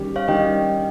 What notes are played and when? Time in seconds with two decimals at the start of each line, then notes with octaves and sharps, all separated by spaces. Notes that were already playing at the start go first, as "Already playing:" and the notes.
Already playing: D#3 G3 C#4 G4
0.16 C#5 F5
0.28 D#3 G3 C#4 G4 D#5 G5